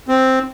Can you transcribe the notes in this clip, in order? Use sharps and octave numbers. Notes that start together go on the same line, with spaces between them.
C4